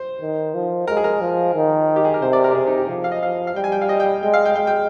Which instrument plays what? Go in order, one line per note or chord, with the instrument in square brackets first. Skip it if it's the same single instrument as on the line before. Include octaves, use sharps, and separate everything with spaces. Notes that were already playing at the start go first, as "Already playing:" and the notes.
Already playing: [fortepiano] C5
[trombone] D#3
F3
[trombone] G#3 [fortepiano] A#4
[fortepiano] G#4
A#4
[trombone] F3
D#3
[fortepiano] G4
G#4
A#4
[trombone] C3 [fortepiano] C5
[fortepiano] D5
A#4
G4
[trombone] C3 [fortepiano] G#4
[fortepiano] D#4
G4
[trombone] F3 [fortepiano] G#4
[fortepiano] F5
D#5
[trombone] F3 [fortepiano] F5
[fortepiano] F5
[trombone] G3 [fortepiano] G5
[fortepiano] G#5
G5
F5
D#5
G5
[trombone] G#3 [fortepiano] G5
[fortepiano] F5
G5
[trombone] G#3 [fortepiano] G5
[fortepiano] G5